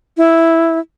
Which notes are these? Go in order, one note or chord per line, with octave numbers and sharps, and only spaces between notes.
E4